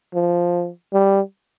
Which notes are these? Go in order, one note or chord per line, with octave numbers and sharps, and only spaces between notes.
F3
G3